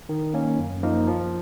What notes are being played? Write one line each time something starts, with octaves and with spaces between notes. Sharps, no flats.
D#3
A#3 C#4
F#2
F3 A#3 D#4 A#4
F3